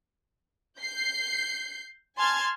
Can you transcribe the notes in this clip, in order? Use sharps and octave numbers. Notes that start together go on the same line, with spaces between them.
G6 C7
G#5 A5 C6 F6 G#6